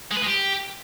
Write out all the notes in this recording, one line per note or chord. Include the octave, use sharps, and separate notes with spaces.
G#3
B4
G#3
G4